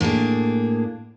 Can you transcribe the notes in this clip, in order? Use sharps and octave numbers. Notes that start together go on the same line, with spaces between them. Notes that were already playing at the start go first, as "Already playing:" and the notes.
A2 A#3 D4 G#4